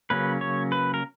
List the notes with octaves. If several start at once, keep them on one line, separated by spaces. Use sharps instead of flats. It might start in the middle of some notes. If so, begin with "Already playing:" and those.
C#3 F#3 A#3 C#4 B4
C#5
B4
A#4